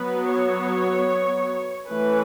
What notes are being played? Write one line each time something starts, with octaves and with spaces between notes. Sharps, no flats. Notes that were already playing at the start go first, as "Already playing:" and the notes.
Already playing: F#3 B3 B4
C#5
E3 A3 C#4 B4